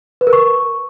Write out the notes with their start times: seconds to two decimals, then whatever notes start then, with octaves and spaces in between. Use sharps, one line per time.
0.21 B4
0.27 A#4
0.33 C#6